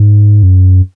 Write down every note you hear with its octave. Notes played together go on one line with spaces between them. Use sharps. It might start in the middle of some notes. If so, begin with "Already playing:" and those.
Already playing: G#2
F#2